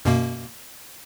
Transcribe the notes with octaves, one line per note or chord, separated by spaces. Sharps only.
F#2 B2 A#3